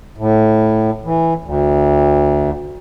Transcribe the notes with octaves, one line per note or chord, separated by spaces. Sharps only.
A2
E3
D2